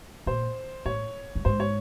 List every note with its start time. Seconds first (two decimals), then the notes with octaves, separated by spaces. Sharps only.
0.26 A#2 C5
0.85 A2 C#5
1.35 G2
1.45 G#2 C5
1.60 C#5